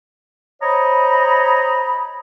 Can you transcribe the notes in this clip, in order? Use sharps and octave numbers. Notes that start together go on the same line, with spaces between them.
C5 C#5 D#5 A#5 B5